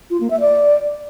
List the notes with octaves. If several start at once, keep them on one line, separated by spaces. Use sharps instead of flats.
F4
A#3
E5
D5